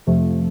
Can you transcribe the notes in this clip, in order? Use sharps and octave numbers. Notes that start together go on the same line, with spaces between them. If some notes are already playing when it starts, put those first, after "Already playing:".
F2 C3 F3 A3